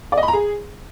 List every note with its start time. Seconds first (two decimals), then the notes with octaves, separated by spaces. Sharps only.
0.12 D5
0.17 D#5
0.23 B5
0.28 A#5
0.33 G#4